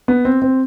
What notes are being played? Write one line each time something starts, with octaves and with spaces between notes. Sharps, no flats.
B3
C4
C4